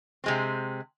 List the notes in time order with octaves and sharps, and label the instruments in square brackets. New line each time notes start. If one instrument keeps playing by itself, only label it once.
[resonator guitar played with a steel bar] C3 G#3 C4